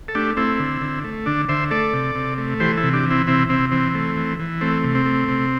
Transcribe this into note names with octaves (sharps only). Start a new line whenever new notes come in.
A4
A3 D4 G4
A3 C4 E4
D3
D3
A3
D3 D4
D3 C5 E5
A3 A4 D5
C3
C3
A3
E3 G4 C5
E4 A4
C3
D4 G4
E3
C4 E4
C3 C4 E4
C3 C4 E4
E3 C4
A3
E3
E3
A3 C4
C3
C4
A3
C3